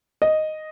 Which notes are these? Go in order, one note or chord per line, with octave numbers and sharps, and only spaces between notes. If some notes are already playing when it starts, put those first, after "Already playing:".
D#5